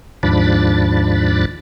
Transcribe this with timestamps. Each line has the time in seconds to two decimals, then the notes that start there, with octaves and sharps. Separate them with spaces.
0.23 D#2 G#2 F3 D4 B5 A6